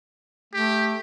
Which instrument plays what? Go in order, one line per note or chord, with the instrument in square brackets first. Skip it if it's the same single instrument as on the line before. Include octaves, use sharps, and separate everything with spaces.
[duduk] A3 [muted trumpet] G4